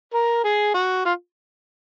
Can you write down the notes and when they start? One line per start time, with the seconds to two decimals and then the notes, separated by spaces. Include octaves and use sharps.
0.14 A#4
0.45 G#4
0.74 F#4
1.05 F4